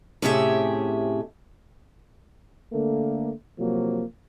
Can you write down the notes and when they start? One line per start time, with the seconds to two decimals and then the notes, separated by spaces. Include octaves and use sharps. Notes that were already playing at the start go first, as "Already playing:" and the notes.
0.22 A2 C3 C#4 G4 G#4 E5
2.73 D3 A3 A#3
3.58 C3 F3 F#3 A#3